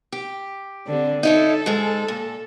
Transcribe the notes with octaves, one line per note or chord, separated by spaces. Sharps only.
G4
D3 C4
D#4 E4 A4 C#5
G#2 G#3
A#2